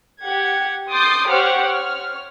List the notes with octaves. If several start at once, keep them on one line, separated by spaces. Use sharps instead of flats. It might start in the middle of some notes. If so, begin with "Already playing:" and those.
G4 F#5 G#6
C6 D6 D#6 G6 A6 C7
G4 C5 C#5 F#5 D6 F6
C#5 F6